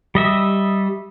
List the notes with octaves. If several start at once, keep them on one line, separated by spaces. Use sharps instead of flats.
G3 D#5 E5